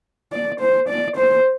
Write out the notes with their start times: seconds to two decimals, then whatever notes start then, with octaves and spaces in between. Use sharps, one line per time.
0.33 D5
0.60 C5
0.89 D5
1.17 C5